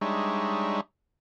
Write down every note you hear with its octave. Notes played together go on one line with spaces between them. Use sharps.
G3 G#3 D4 D#4 C#5 E5